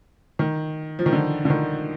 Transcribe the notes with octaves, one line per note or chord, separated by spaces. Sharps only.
D#3
F3
D#3
D3
D3
D#3